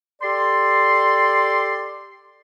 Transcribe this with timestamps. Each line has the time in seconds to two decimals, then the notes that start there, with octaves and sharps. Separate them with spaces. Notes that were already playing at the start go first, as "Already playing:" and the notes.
0.22 G4 A4 D5 C6